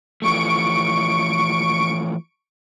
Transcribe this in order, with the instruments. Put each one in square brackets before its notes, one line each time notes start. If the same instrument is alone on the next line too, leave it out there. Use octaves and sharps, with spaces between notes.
[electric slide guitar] E3 F3 A3 [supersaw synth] C#6 D7